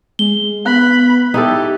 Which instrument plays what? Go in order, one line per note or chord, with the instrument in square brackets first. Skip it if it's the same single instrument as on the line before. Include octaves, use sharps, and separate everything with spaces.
[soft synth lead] G#3 [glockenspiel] G7
[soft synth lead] B3 [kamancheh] B5 [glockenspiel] F#6
[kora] D#4 E4 A4 [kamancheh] G4